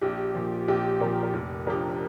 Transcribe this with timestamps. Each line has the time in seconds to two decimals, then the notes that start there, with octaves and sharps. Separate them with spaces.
0.01 A#1 G4
0.35 A#2 F3
0.68 A#1 G4
1.00 A#2 F3 A#4
1.23 A#4
1.33 F1 G4
1.67 F2 F3 D4 G4 A#4